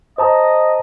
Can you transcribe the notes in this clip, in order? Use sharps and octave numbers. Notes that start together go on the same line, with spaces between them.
C5 D#5 A5 A#5